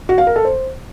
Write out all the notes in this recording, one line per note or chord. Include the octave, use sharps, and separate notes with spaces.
F#4
F5
A#4
A4
C5